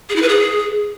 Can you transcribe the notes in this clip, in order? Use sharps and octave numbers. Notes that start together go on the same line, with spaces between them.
G#4
E4
B4
G#4